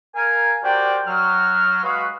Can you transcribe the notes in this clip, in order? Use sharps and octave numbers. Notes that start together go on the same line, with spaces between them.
A#4 F5 G#5
F#4 G4 A#4 C5 D5 G5
F#3 F6
G#3 F#4 B4 F5